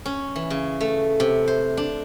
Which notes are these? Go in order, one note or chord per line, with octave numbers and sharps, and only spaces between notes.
C#4
E3
C#3
A3
C3
C5
D4